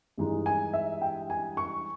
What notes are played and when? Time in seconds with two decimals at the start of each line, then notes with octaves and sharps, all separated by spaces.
0.18 G2 E3 G#3 D#4
0.46 G#5
0.73 E5
1.02 G5
1.30 G#5
1.57 C#6